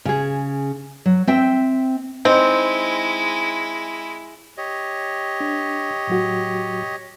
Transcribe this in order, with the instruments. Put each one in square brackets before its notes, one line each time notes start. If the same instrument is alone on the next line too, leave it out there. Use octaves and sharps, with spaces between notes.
[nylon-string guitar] C#3 G#4
F#3
C4 E5 G5
[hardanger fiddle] G#3 E4 [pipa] C4 [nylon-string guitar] D#4
[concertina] G4 C#5 D#5
[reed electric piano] D4
A2 F#3 F#4